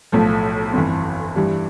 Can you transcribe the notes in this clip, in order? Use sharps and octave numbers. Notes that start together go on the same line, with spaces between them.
B1 A2 F3 A3
G1 F2 E3
G2 E3 G3